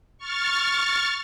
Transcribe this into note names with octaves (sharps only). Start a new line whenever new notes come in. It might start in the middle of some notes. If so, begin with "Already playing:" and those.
C#6 F6 A6